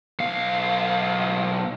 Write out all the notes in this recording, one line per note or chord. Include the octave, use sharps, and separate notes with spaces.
B1 F5